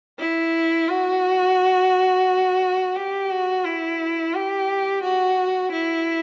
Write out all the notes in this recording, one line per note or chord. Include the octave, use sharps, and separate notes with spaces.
E4
F#4
G4
F#4
E4
G4
F#4
E4